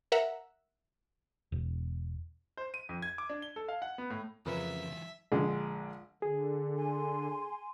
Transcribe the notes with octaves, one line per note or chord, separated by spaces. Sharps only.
A#4 E5 F#5 A#5
E1
C5
D#7
F2
G#6
D6
D4
G7
A4
F5
F#5
B3
A2
F2 C#3 E3 F#3 A#4 B4 E5
A#1 D3 G#3
D3 G#4
G#5 C6